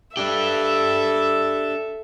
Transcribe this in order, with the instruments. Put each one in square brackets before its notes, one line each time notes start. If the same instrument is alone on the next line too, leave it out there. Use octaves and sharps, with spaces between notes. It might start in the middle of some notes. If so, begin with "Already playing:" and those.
[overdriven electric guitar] D4 G4 [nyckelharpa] A4 E5